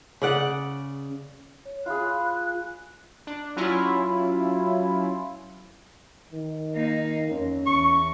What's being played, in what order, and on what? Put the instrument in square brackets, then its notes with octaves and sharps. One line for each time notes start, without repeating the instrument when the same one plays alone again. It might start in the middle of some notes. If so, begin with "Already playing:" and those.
[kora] C#3 D5 F#5
[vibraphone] C#5
[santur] F4 G#4 [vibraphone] F5 B5 [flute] F#6
[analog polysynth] D4
F#3 C#4 E4 F4
[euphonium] D#3
[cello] A#3 D#4
[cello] F2 [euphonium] C#4
[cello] E2 [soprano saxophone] C#6